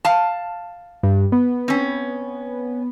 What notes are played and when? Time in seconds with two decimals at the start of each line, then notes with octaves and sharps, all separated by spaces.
0.05 F5 A5
1.03 G2
1.32 B3
1.68 C4 C#4